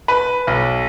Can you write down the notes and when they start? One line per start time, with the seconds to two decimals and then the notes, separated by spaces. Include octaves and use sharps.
0.08 B4
0.47 B1